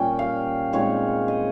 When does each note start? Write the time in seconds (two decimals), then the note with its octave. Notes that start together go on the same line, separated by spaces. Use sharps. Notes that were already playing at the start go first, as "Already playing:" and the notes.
Already playing: A#2 G3 C#4 G5
0.19 F5
0.73 A#2 G#3 C4 D#4 C#5
1.28 D#5